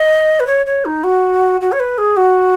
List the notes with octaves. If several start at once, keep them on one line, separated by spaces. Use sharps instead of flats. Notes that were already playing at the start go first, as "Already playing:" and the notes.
Already playing: D#5
B4
C#5
C#5
D#4
F#4
F#4
C#5
B4
G#4
F#4